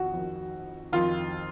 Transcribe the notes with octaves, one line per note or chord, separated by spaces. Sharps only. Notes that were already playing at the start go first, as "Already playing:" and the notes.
Already playing: F2 D#3 F#4
F2 D#3
F2 D#3 F4